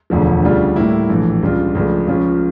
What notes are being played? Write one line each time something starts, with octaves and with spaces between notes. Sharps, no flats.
E1 D2 D3 F3
D2 C#3 G3 D4 F4
A2 G3 A#3 E4
A#1 A2 E3
C#2 C#3 G3 D4 F4
C#2 C#3 F3 A3 D4
C#2 C#3 F3 C#4 F4